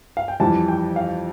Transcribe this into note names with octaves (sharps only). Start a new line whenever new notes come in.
F5
G5
F2 E3 G3 A5
G5
F5